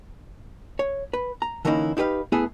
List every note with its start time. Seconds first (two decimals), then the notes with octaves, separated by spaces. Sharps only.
0.79 C#5
1.13 B4
1.42 A#5
1.65 D3 E3 A#3 C#4 D#4 E4
1.97 D#4 E4 G4 B4 F5
2.32 A3 B3 E4 G#4 E5